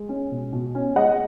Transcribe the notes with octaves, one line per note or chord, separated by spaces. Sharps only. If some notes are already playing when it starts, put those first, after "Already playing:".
Already playing: G#3
C#4
B2
B2
C#4
G#3 D#5 F#5